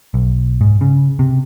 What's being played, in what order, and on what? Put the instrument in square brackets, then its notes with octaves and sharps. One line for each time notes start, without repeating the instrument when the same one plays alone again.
[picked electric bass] B1
G#2
C#3
C3